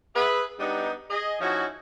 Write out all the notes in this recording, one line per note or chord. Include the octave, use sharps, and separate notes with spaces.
G#4 B4 E5
G3 B3 D4 D#4
G#4 D#5
F3 C#4 D#4 E4 F#4